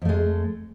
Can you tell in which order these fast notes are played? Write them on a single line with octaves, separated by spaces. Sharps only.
F2 A3 G#3